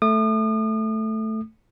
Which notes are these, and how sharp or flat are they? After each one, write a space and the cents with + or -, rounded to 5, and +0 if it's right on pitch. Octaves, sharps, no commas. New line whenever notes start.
A3 +0 D#6 -40